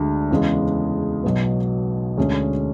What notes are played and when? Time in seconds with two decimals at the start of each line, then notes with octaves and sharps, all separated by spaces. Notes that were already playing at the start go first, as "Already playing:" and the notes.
Already playing: D2 D3 G#3 D4
0.31 E2 C#3 G#3
1.23 B1 B2 F#3 B3
2.17 D2 D3 G#3 C#4 G#4